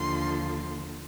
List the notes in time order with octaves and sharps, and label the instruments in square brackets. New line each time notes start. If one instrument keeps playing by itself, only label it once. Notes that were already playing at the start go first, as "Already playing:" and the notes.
Already playing: [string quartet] D#2 D3 F3 C6